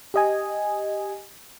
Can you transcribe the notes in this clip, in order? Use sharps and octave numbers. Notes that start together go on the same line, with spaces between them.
G4 D#5 G#5